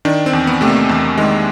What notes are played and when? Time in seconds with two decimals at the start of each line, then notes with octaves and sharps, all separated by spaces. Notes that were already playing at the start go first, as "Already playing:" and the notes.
0.05 D#3 D4
0.26 C4
0.33 E2
0.47 B3
0.61 C3 A3
0.68 A#3
0.89 E2
1.17 D#3 G#3